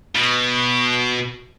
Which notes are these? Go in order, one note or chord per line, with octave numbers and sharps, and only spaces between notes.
B2